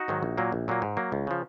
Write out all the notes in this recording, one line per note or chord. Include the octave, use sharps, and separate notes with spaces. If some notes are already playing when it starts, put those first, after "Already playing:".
Already playing: D#4 F#4
G#2 D#3 F#3
A#1
A#2 F#3 A#3
A#1
A#2 F#3 A#3
G#2
F#3 A#3
C#2
C#3 F3